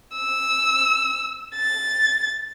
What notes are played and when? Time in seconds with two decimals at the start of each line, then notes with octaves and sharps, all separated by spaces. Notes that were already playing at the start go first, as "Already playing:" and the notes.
0.16 E6
1.56 A6